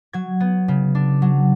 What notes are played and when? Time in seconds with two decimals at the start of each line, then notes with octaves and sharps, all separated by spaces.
0.13 F#3 G#6
0.40 B3
0.68 C#3
0.95 D4
1.22 F#3